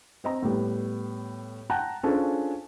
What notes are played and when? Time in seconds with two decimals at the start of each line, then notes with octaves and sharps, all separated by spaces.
0.24 C4 D#5 A#5
0.42 A2 G3 B3
1.70 F#5 G5 A5 A#5 F#6
2.03 C#4 D4 F4 G#4 A4 C5